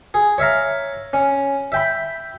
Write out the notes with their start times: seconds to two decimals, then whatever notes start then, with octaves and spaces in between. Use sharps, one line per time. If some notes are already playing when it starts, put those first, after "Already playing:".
0.14 G#4
0.38 C#5 E5 F5 A#5
1.13 C#4
1.72 E5 G5 B5